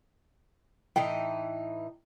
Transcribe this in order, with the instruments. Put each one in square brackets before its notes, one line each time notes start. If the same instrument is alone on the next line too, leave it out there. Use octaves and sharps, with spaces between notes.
[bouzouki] A2 E3 D#4 [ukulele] G5